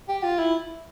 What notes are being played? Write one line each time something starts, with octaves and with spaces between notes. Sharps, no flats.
G4
F4
E4